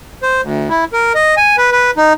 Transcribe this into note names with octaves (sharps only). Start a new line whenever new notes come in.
C5
D2
E4
A#4
D#5
G#5
B4
B4
D#4